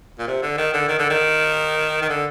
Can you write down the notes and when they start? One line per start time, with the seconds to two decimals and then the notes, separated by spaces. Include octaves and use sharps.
0.19 A#2
0.27 C3
0.42 D3
0.58 D#3
0.73 D3
0.88 D#3
0.99 D3
1.10 D#3
2.02 D#3
2.09 D3